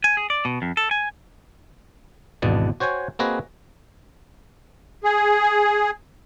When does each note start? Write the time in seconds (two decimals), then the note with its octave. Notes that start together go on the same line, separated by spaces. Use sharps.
0.04 G#5
0.17 G#4
0.30 D5
0.45 B2
0.62 F2
0.77 A4
0.91 G#5
2.42 G#1 E2 B2 D4 A5
2.80 F#4 C5 C#5 G5 G#5
3.19 A#3 C4 F#4 G#4 B4 D#5
5.04 G#4